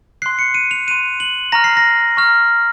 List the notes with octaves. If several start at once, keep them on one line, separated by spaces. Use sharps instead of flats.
C6 F#6 C7
C#7
D#7
F7
C6 F#6 D#7
F#7
A#5 C#6 F6 A#6
C7
A#6
A#5 C#6 F6